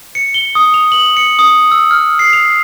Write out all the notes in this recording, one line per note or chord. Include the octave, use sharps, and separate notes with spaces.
C#7
G7
D#6
F7
F#7
C#7
D#6
E6
F6
C7
F7